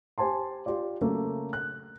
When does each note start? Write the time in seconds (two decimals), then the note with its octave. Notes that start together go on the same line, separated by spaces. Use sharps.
0.18 G4 C5 G#5 A5 C6
0.66 F4 G4 D5
1.01 C#3 F#3 A3 A#3
1.53 F#6